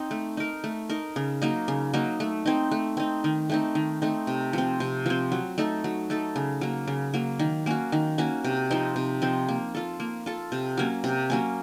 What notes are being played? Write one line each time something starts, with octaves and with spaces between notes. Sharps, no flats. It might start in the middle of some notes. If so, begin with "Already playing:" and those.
Already playing: C4 D#4
A3
D#4 A#4
A3
D#4 A#4
C#3
F#3 A#3 D#4
C#3
F#3 A#3 D#4
A3
C4 D#4
A3
C4 D#4
D#3
A3 C4 D#4
D#3
A3 C4 D#4
C3
F3 C4
C3
F3 C4
F#3
A3 D#4 A4
F#3
A3 D#4 A4
C#3
F#3 A#3
C#3
F#3 A#3
D#3
A#3 C#4 F#4
D#3
A#3 C#4 F#4
C3
F3 C4 D#4
C3
F3 C4 D#4
A#3
F4 A4
A#3
F4 A4
C3
F#3 A#3 C#4
C3
F#3 A#3 C#4